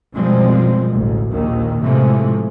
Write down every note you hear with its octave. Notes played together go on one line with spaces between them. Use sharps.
F#2 B2 F3 G3 G#3 C4
A1 D2
A#1 D#2 A#2 D#3
A2 C3 E3 F3 G#3 A3